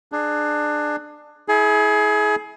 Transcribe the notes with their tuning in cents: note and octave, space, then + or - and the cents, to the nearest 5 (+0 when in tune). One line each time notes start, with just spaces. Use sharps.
D4 +20 G#4 +20
E4 -25 G#4 +25